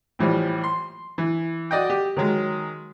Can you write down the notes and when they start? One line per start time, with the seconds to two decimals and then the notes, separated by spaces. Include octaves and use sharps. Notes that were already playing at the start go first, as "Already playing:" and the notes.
0.19 A2 E3 F3 G3
0.64 C6
1.18 E3
1.71 F#4 D5 D#5 G5
1.90 G4
2.17 D#3 F#3 G#3